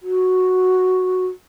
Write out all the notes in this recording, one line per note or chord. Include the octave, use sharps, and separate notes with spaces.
F#4